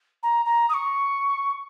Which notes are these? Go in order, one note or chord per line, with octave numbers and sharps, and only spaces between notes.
A#5
A#5
D#6
C#6